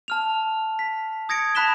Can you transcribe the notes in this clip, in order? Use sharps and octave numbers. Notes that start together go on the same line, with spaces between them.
A5 F6 F7
B6
D#6 G#6 A#6 C#7 D7
A5 B5 F#6 B6 E7 G7